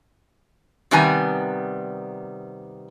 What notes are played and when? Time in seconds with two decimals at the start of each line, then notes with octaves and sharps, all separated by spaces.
0.91 C3 D#3 G3 B3 G#5 A#5